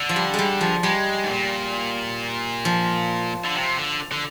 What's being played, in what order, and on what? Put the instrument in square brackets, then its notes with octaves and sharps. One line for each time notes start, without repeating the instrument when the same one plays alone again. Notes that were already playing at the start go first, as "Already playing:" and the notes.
Already playing: [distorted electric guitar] D3
[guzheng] F3
G3
G3 G#3
F3
[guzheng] G3 [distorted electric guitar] G#3
[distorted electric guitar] G#2
A#2
[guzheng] F3
[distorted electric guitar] D3
C3
D3
D3